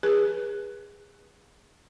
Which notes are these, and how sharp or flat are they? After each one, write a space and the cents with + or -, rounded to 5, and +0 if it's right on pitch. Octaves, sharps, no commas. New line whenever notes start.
G#4 -25 B4 -35